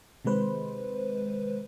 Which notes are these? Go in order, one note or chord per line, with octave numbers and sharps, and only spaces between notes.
C3 D#3 G#3 B4 C5